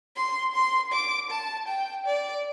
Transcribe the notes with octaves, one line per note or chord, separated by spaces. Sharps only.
C6
C6
D6
A5
G5
D5